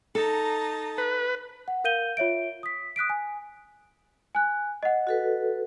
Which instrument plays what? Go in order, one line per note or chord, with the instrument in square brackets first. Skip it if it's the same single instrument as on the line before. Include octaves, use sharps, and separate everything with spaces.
[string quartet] D#4 A5 A#5 [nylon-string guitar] A4
[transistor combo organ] B4
[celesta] F#5
A#4 F5 G6 D#7 G7
F4 C#5 E5 D7
D#6 B6
D#6 F#6 B6 D7
G#5
G#5 F#6
D#5 F#5
[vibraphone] F#4 A4 B4